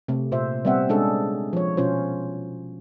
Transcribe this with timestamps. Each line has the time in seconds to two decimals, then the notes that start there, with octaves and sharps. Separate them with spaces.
0.08 C3 A3
0.32 A#2 C5 E5
0.65 G3 B3 C4 C5 E5 F#5
0.89 G#3 C#4 D4 G#4 A4
1.53 F3 C#5
1.77 B2 C#4 F4 C5